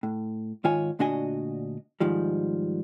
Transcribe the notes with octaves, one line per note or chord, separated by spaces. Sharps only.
A2
G#2 D#3 F4 C#5 G#5
D2 A#2 D4 F#4 D#5 G#5
G#2 D#3 F3 G3